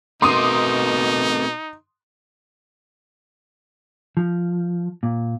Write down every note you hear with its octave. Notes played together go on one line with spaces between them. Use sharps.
B2 A3 C4 D#4 A#4 C6 D6 D#6
F3
A#2